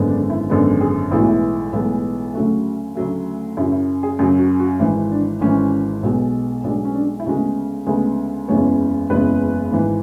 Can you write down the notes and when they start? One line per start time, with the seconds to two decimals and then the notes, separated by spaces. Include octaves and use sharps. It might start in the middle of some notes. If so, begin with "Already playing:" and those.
Already playing: G#1 F#2 D3 G#3 B3
0.09 D4
0.30 E4
0.50 G#1 F#2 D3 G#3 B3
0.81 G#4
1.11 B1 A2 E3 G#3 B3 E4
1.19 F#4
1.28 E4
1.73 B1 A2 E3 G#3 B3
2.34 D2 C#3 F#3 A3 F#4
2.96 D2 C#3 F#3 A3
3.57 F#2 C#3 F#3 E4
3.72 E4
4.03 G#4
4.19 F#2 C#3 F#3 G#4
4.39 F#4
4.60 F#4
4.79 G#1 G#2 E3 E4
5.11 D4
5.41 G#1 G#2 E3 C#4
6.03 B1 B2 G#3
6.64 B1 B2 G#3 D4
6.85 C#4
6.95 D4
7.20 E4
7.26 D2 C#3 G#3 B3 F#4
7.87 D2 C#3 G#3 B3 G#4
8.48 F#1 E2 C#3 G#3 B3 C#5
9.10 F#1 E2 C#3 G#3 B3 B4
9.71 G#1 G#2 E3